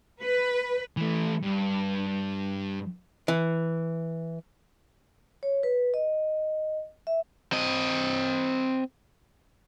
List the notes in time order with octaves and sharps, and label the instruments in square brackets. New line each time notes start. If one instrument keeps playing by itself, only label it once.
[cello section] B4
[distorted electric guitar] E3 A3
G2
[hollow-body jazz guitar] E3
[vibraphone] C#5
B4
D#5
E5
[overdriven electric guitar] C4 D#5